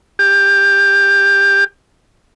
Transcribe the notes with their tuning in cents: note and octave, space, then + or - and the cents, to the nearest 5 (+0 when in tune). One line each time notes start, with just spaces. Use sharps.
G4 +20